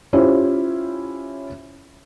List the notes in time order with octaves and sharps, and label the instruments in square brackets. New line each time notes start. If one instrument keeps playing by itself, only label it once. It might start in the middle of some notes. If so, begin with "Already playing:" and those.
[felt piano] C#4 E4 F4 G4 C5